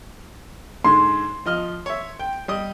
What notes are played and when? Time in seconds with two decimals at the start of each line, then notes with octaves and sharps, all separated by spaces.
0.85 G#2 D3 G#3 C6
1.46 F3 D#5 F6
1.86 C#5 E5
2.19 G5
2.48 G3 D#5 D#6